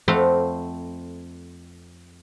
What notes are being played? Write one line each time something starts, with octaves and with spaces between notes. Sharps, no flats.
F2 A3 C4 F5 F#5 B5